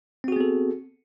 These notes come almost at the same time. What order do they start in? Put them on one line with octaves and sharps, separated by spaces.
C4 F#4 G#4 B3 A4